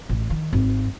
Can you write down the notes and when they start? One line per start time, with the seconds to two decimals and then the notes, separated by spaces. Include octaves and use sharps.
0.09 A1
0.30 D#3
0.53 G#1